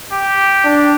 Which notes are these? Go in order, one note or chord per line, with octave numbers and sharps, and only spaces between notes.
G4
D4